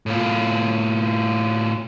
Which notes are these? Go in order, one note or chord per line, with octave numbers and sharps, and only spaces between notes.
A2 F4